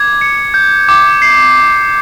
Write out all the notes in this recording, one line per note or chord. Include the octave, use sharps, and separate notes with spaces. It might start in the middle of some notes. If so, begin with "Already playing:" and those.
Already playing: D6 G#6
C#7
G6
D6
C7